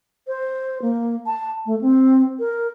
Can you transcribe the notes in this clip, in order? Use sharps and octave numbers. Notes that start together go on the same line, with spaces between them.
C5
A#3
A5
A3
C4
A#4